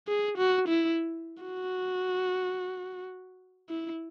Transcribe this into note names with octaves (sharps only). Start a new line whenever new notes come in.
G#4
F#4
E4
F#4
E4